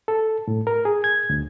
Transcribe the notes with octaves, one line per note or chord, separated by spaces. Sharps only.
A4
A2
A#4
G#4
G#6
D2